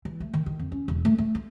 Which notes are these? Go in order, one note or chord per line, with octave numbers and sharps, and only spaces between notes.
E3
A3
D#3
D#3
F2
C#4
E1
A3
A3
F4